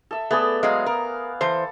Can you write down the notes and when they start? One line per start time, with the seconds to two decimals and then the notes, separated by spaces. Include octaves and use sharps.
0.11 A4 E5
0.31 A3 B3 G#4 D5
0.63 F#3 G#3 F5
0.86 A#4
1.41 E3 A4 C5